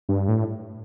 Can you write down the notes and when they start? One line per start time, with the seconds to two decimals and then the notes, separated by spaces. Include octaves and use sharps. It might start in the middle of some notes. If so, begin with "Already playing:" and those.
0.09 G2
0.28 A2